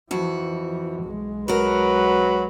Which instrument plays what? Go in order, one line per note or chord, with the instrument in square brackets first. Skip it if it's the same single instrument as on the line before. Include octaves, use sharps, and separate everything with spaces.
[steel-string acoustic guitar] F2 F#4 [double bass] E3 F3
[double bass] B1 G#3
[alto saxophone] F#3 [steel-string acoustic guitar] F#4 A#4 [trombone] B4